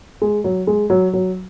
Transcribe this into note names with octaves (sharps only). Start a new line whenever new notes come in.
G#3
F#3
G#3
F#3
F#3